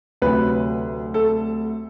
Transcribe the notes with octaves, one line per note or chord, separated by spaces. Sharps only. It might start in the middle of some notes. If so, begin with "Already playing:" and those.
D2 C3 F#3 B4
A4